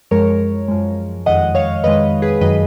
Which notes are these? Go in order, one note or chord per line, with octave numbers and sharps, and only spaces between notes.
F#2 F3 G#3 A#4 C#5
F#2 F3 G#3
F2 D#3 G#3 D#5 F#5
C#5 F5
F2 D#3 G#3 B4 D#5
G#4 B4
F#2 D#3 F#3 B4 D#5